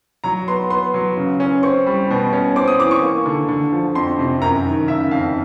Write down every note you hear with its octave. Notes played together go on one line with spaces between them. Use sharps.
F#3 A#5
B3 C6
B3 C6
F#3
C#3
C#4
C4 C#6
G3
B2
C#4
C4 D6
D#6
E3 D6
C#6
A#3
D3
D3
F3
F2 C6
C3
F#2 A#5
D#3
C#3 E5
F2 F5